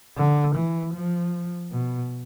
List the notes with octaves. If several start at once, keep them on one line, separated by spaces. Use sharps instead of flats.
D3
E3
F3
B2